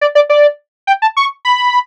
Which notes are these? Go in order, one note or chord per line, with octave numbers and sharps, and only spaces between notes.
D5
D5
D5
G5
A5
C#6
B5